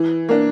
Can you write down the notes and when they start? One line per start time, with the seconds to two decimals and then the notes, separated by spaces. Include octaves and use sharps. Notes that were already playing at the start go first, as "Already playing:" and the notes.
Already playing: E3
0.29 A#3 D4